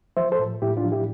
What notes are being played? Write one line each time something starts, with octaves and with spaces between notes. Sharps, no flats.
F3 C5 E5
A4 C5
A2
A2 E4 G4
D4 F4
F3
E4 G4